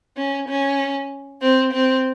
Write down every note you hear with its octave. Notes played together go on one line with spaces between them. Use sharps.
C#4
C#4
C4
C4